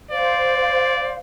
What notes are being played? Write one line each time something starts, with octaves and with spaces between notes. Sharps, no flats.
C5 D5 F5